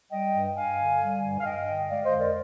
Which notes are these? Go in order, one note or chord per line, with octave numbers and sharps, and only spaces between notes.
G3 D#5 G5
G2
G2 F5 G#5
D3
G3
G2
F5
G2 D#5 G5
D3
G#3 D5 F5
C5 D#5
F2
A#4 D5